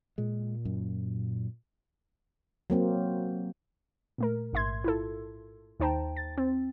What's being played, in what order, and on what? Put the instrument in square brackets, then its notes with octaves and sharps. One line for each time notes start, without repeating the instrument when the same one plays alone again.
[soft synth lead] A#2 [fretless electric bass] G#3
[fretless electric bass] F#2
[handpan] F#3 A#3 C4
[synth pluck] A#2 A3 A#4
A1 G#2 E5 C6 G#6
E4 F4 A4
D#2 D#4 C5 G5 A5 A#5
A6
C4